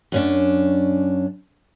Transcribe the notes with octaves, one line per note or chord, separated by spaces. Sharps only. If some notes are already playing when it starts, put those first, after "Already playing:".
F#2 C#4 D4